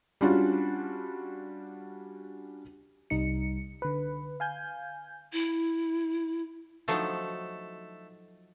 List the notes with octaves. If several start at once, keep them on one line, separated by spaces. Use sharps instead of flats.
G3 C#4 D4 F4 F#4
C2 G3 D#4 C#7
D3 B4
F5 G#5 G6
E4
F3 F#3 A3 D#4